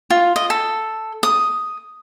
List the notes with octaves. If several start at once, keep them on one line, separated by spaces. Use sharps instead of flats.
F4
D#5
A4
D#6